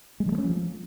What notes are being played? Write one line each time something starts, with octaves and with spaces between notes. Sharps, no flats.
G#3
F3
A3
C#4
F3